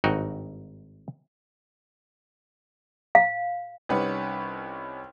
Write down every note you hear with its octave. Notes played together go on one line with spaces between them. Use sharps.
G#1 G2 D#4 F#4 G5
F5
C2 G3 C#4 D#4 B4 F#5